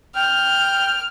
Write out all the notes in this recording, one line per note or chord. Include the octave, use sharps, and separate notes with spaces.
G5 F6